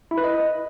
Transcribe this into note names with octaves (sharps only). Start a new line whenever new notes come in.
E4
B4
D#5